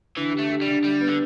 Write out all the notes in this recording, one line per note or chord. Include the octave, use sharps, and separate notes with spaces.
D3 E3
G4
A3
G4
G3
D3
G3 G4
B3
D3